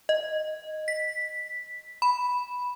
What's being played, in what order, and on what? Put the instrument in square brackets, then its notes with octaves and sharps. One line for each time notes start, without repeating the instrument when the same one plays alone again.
[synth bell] D#5
B6
B5